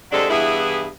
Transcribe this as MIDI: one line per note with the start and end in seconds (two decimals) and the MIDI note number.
0.11 0.26 48
0.11 0.26 54
0.11 0.26 56
0.11 0.26 62
0.11 0.26 69
0.30 0.86 43
0.30 0.86 52
0.30 0.86 59
0.30 0.86 64
0.30 0.86 68
0.30 0.86 76